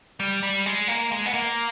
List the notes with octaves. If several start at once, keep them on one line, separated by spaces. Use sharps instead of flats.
G3
G3
G#3
A#3
G#3
B3
A#3